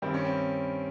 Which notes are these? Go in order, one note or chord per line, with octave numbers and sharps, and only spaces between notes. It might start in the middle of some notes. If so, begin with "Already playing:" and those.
G2 D#3 G3 C4
C#4
C4